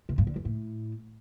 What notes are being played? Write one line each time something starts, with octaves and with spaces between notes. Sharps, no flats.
C3
G2
D3
F#2
A2